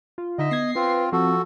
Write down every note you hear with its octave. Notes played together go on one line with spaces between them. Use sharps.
F4
D3 D#4 D#5 E5
B3 G#6 A#6 C7
C4 F4 B4
F3 C4 F#4 A4